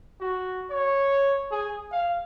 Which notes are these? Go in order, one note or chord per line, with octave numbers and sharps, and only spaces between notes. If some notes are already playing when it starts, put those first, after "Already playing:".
F#4
C#5
G#4
F5